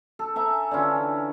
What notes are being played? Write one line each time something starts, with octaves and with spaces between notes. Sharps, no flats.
A4
A4 E5 G#5 A#5
D3 E3 C#4 F4